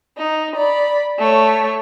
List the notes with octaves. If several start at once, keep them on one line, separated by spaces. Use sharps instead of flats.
D#4
D5 B5
A3 C#5